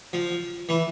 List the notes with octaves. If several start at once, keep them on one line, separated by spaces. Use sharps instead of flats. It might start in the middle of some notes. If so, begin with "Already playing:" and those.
F3
E3